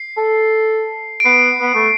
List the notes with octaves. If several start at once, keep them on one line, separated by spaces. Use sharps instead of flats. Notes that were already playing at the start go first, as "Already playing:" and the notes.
Already playing: C7
A4
D7
B3 C7
B3
A3